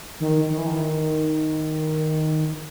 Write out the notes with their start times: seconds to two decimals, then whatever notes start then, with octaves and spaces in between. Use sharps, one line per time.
0.20 D#3
0.50 D#3
0.58 E3
0.66 D#3